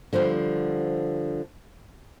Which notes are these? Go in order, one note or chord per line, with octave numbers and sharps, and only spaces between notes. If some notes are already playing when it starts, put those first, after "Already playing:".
D3 F3 G3 C5